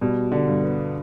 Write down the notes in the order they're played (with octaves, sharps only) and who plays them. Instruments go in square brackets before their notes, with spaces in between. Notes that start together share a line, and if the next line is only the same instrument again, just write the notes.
[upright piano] B2 [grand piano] G3
[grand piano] D3
[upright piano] G2
[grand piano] B3